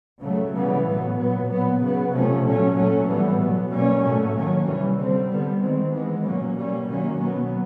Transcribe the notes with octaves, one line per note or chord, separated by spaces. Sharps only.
C#3 F#3 A3
C#3 E3 G3 B3
A2 F#3 B3
A#2 F#3 B3
A#2 F#3 B3
C#3 F#3 B3
C3 F3 A3 C#4
A#2 F#3 A3 C#4
A#2 F#3 A3 C#4
A2 E3 G3 B3
B2 F#3 B3
B2 G3 A#3 C#4
A2 F#3 A3 C#4
D#3 F#3 A#3 C#4
C3 E3 G3
D3 G3 C4
D3 G3 B3
D#3 G#3 C4
E3 G#3 B3
A#2 F#3 A#3 C#4
B2 G3 A#3 C#4
D#3 F#3 A#3 C#4
B2 F#3 B3